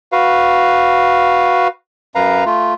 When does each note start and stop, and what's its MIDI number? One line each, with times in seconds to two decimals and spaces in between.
0.12 1.68 66
0.12 1.68 71
0.12 1.68 77
2.15 2.44 42
2.15 2.44 71
2.15 2.44 77
2.15 2.44 82
2.46 2.74 57
2.46 2.74 65